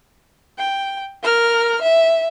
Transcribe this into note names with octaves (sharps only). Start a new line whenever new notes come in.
G5
A#4 F6
E5